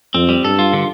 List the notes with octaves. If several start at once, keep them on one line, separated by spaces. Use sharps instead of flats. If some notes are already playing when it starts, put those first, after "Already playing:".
F2 C4
G3
G2 A4
F4
D3